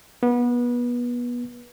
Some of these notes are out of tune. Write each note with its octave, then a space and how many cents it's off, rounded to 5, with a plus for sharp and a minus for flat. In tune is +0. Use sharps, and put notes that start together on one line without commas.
B3 -25